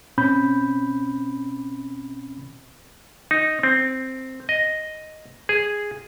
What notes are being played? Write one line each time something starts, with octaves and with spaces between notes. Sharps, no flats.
B2 C4 C#4 B5 G6
D#4
C4
D#5
G#4